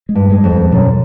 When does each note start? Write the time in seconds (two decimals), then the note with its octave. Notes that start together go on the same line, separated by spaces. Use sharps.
0.09 G#3
0.15 G2
0.30 G#3
0.44 F2
0.52 E2
0.72 F#2 B2